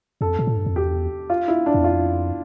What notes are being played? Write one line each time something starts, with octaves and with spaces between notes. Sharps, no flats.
F2 A4
A#2
A2
G2
F2
E2 G4
F4
E4
D4
E2
F2 F4